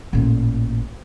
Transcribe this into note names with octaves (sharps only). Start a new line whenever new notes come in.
A1 A#2